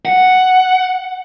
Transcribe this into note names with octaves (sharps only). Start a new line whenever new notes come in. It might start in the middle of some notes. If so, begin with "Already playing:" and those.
F#5